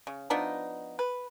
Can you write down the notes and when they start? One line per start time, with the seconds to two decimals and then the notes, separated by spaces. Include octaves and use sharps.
0.07 C#3
0.30 F3 B3 D4 D#4
0.99 B4